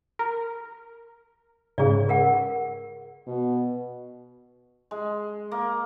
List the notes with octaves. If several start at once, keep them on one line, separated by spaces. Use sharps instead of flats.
A#4
G#2 C#3 G#4 D5
A#4 F#5
B2
G#3
A#3